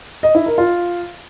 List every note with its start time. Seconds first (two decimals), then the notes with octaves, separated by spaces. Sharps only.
0.23 D#5
0.35 E4
0.46 A#4
0.58 F4